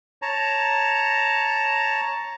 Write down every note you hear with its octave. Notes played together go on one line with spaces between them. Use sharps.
C#5 A5 A#5